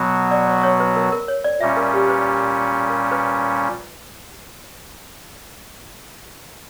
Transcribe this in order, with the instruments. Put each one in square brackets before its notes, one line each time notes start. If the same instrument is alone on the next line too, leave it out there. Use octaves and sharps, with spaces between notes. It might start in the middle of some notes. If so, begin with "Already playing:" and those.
Already playing: [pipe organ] B2 F#3 B3 F#4
[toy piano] D5
C#5
C#5
B4
A#4
A#4
C#5
D5
[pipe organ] A#2 G3 C#4 [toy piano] E5
[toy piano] A#4
G4
B4
A#4
B4